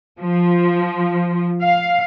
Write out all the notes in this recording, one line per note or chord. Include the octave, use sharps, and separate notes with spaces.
F3
F5